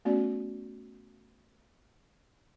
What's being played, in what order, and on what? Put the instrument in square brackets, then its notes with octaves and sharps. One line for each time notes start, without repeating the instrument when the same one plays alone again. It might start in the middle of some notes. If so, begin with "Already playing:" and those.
[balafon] A3 B3 C#4 F#4 D5